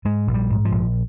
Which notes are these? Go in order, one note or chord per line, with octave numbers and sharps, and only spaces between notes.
G#2 G#3
A#1
G3
G#2
F3
A#1